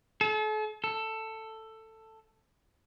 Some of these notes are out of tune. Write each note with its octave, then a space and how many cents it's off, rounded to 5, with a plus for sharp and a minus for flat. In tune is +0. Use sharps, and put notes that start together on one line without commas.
A4 -40
A4 +10